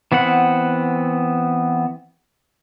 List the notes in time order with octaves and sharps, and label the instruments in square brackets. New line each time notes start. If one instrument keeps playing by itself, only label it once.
[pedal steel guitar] E3 B3 C4 F#5